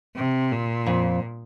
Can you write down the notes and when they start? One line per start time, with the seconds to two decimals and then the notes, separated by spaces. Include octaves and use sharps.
0.16 C3
0.52 A#2
0.86 F2